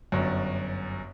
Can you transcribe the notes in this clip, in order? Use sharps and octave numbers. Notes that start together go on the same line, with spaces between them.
G1 F#2